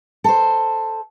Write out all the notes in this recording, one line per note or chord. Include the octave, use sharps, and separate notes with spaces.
A4 C5